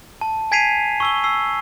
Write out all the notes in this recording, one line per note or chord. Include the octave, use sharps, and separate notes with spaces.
A5
G#5 G#6 B6 C7 D#7 F7
C#6 E6 G7
E6 C7